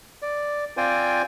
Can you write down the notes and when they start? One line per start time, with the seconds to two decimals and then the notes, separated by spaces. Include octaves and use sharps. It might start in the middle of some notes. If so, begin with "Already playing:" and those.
0.22 D5
0.77 C4 F4 C5 D5 G5 G#5